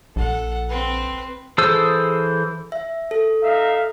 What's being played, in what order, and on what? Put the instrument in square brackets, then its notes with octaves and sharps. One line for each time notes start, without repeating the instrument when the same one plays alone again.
[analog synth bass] A#1 [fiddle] A4 F#5
[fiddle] C4 B4
[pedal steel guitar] E3 G#4 A4 C5 E6
[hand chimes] E5
A4
[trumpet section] D#4 E5 F5